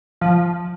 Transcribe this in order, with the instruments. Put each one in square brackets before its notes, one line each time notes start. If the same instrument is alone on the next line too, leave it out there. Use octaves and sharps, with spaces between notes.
[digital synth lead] F3